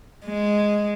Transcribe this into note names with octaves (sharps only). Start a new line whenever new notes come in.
G#3